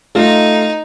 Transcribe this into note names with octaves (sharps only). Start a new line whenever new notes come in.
A3 D#4 F4